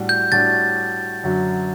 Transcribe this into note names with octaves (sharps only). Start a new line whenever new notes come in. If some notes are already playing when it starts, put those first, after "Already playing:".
Already playing: A2 G3 D4 F#4
G6
A2 G3 D4 F#4 A6
F#2 D3 F#3